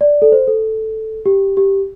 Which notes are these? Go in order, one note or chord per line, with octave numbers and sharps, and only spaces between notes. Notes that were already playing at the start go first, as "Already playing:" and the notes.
D5
A4
C5
A4
G4
G4